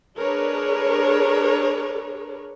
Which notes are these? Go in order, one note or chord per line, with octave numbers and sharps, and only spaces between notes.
D4 G#4 A#4 B4 C#5